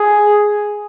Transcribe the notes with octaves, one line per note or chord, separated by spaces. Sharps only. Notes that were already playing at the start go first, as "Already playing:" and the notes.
Already playing: G#4